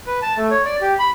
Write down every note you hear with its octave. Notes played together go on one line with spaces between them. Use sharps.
B4
A5
A3
C#5
D5
G4
B5